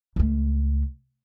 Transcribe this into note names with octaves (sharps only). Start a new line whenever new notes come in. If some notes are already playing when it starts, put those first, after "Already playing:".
C#2 A3